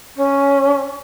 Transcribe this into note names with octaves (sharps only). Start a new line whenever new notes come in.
C#4